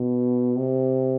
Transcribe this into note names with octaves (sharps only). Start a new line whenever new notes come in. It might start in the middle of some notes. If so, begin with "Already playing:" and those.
Already playing: B2
C3